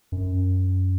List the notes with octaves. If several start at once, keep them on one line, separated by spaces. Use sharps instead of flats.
F#2